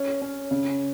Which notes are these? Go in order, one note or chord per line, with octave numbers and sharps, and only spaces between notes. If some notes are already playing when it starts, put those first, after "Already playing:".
Already playing: C#4
C#4
C#3